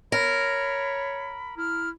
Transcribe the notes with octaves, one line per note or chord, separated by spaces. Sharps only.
A#4 C#5 B5
E4 F6